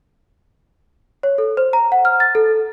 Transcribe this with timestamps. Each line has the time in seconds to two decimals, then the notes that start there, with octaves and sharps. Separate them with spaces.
1.23 C#5
1.38 A4
1.57 C5
1.73 A#5
1.92 F#5
2.05 F6
2.20 A6
2.35 A4